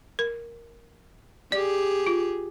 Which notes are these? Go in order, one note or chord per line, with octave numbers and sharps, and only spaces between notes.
A#4
G4 G#4 D5
F4